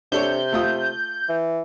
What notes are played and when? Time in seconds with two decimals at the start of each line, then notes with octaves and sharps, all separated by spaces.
0.12 C3 D4 A4 C#5 G6
0.53 A3 F4 D#6
1.29 E3